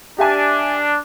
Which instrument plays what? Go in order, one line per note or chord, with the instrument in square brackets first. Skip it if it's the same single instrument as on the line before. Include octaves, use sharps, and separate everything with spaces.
[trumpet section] D4 [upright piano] G4 E5 G#5